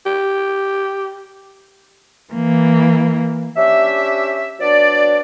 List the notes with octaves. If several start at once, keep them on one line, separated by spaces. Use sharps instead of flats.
G4
E3 A#3
C#4 D4 G4 E5
F#3 B3 D4 D5